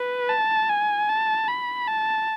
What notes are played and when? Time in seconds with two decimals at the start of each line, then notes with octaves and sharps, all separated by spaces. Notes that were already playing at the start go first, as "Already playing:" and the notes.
Already playing: B4
0.29 A5
0.69 G#5
1.09 A5
1.48 B5
1.87 A5